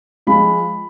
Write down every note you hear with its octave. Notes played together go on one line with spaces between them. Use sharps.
F3 G#3 B5